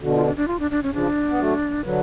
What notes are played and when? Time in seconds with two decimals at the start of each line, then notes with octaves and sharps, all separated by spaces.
0.02 B2 D3 F#4
0.14 F4
0.26 D4
0.37 D4
0.48 F4
0.59 D4
0.71 D4
0.83 C#4
0.94 C#3 F3 D4
1.30 B3
1.40 F#3 A3
1.85 D3 F#3 B4